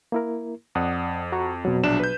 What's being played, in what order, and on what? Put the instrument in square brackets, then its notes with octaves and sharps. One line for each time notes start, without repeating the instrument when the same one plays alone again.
[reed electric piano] A#3 E4 A#4
[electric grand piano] F2 [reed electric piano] D5 F#5 D#6
[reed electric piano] F#4 A#5 C#6
B2 F#3
[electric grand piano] A#1 D4 E7
B4 G6